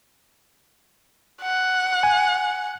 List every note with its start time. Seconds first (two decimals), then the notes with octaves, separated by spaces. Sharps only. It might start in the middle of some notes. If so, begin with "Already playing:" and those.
1.42 F#5
2.03 G#5